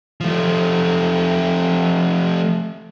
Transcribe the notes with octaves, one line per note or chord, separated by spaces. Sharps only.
F3 A3